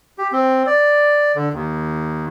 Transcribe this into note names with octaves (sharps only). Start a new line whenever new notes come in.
G4
C4
D5
D3
D#2